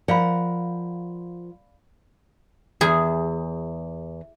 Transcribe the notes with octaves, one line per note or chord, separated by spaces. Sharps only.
F3 A#4 D5 F5 F#5 B5
E2 G#4